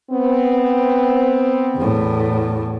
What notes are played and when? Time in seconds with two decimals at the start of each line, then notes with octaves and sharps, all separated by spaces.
0.11 B3 C4
1.76 E2 A2